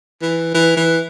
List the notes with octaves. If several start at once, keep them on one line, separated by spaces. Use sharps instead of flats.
E3
E3
E3